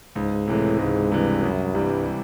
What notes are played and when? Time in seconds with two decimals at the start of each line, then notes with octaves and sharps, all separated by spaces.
0.15 C#2 G#2
0.48 A2 C3 E3 G#3
0.79 C#2 G#2
1.12 G2 C3 E3 G#3
1.43 C2 F#2
1.75 G2 C3 E3 G3